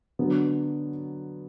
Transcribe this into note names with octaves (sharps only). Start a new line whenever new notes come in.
D3 F#3 B3